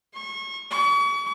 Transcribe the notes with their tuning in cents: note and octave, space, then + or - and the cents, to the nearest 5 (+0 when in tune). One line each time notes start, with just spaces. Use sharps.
C#6 -30
C#6 +40